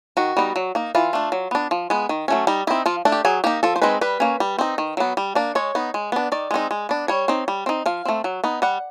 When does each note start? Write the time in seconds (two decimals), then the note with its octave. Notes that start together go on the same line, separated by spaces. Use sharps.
0.17 D#3 F#4
0.37 G3 B3 D#4
0.56 F#3
0.75 A#3 D#4
0.95 E3 F4
1.13 A3 D4
1.32 F#3
1.51 B3 D4
1.71 F3
1.90 G#3 B3
2.09 D#3
2.28 F#3 A3 C#4
2.47 G3 D#4
2.67 C4 D#4 E4
2.86 F3 F4
3.05 A3 D4
3.12 G4
3.25 F#3 G#4
3.44 A#3 D#4 G4
3.63 F3 A4
3.76 C5
3.82 G#3 C4 D#4 B4
4.01 G3 B4
4.20 A#3 C#4
4.40 G3
4.58 C4 D#4
4.78 D#3
4.97 F#3 B3
5.17 G3
5.35 A#3 D4
5.55 G#3 C#5
5.75 B3 D#4
5.94 G#3
6.12 B3 D4
6.32 D#3 D5
6.51 G#3 C4 D#4
6.71 G#3
6.89 B3 D4
7.08 G3 C#5
7.28 C4 D#4
7.48 G3
7.66 C4 D#4
7.86 F3 F5
8.05 A3 C4
8.24 F#3
8.44 B3 D#4
8.62 G3 F#5